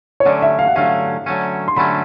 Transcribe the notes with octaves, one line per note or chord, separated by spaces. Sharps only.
C#5
D3 F#3 A3 C#4 D5
E5
F5
F#5
D3 F#3 A3 C#4 F5
D3 F#3 A3 C#4
C6
D3 F#3 A3 C#4 B5